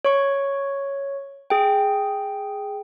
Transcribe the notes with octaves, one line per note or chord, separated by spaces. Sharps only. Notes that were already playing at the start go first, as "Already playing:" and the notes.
C#5 C#6
G#4 G5